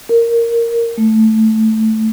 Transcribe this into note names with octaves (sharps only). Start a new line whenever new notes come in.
A#4
A3